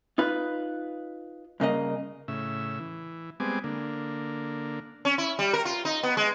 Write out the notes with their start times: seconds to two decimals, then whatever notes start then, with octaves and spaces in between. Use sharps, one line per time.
0.18 D#4 F4 B4
1.60 G2 C#3 A#3 D#5
2.28 A2 C#3 E5
2.79 E3
3.40 G3 G#3 B3 C4 G#5 D6
3.64 D3 A#3
5.05 C#4
5.18 E4
5.39 G3
5.53 A#4
5.65 F4
5.85 D#4
6.03 B3
6.17 G#3